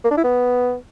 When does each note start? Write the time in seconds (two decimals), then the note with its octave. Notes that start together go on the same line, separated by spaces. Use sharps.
0.04 A#3
0.11 D4
0.17 E4
0.24 B3